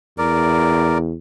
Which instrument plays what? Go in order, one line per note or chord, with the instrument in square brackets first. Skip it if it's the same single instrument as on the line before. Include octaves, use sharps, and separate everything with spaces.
[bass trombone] E2 [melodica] A#4 D5